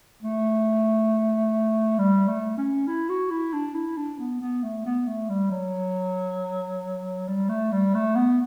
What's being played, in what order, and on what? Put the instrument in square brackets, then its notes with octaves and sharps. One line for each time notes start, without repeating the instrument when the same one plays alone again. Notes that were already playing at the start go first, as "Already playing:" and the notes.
[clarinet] A3
G3
A3
C#4
E4
F#4
E4
D4
E4
D4
B3
B3
A3
B3
A3
G3
F#3
G3
A3
G3
A3
B3